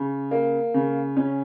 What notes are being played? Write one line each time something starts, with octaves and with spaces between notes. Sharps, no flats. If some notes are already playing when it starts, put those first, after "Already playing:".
Already playing: C#3
A#3
C#3
C#4